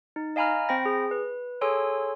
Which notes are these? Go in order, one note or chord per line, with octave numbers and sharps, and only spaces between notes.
D#4
D#5 F5 G#5 A#5 B5 F6
C4 C5 G5 B5 A#6
G#4
B4
G#4 A4 C#5 G#5 C6 E6